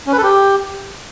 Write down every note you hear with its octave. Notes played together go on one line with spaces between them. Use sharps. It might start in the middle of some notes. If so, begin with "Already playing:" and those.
C#4
B4
A4
G4